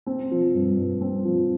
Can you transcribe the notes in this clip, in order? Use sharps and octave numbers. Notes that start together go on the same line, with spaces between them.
C4
F3
G2
G2
C4
F3